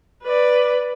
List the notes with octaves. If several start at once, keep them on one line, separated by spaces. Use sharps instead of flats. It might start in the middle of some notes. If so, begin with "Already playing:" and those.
B4 D5